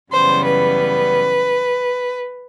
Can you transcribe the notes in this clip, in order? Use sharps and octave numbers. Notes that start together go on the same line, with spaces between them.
F#2 C#3 E3 G3 B3 C5
B4